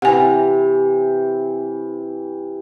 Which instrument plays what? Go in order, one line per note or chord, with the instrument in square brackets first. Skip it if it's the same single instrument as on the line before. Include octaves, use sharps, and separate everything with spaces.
[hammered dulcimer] C3 E3 [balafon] F#5 G#5